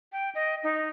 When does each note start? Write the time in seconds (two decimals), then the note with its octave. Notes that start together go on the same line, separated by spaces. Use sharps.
0.12 G5
0.35 D#5
0.63 D#4